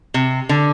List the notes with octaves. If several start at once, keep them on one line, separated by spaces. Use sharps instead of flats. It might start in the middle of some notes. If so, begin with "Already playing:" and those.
C3
D3